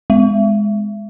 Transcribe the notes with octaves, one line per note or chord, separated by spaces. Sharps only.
G#3